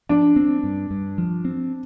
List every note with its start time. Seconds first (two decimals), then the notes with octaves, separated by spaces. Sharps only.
0.09 F3 D4
0.36 C4
0.63 G2
0.91 G2
1.18 F3
1.45 C4